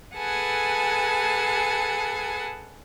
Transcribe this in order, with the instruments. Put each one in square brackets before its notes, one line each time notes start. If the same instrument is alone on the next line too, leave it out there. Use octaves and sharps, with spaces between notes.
[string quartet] G#4 A4 B4 F#5 G#5 A5